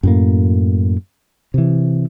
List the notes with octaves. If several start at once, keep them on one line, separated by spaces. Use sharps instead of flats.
F#2 A2 A#3
C3 E3